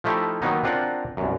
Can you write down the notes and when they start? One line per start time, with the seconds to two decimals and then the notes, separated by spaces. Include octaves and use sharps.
0.04 F3 A3 D#4 E4 G4
0.42 D#3 F#3 A#3 B3 D#4
0.64 C4 D4 F4 A#4 F#5
1.17 C2 F#2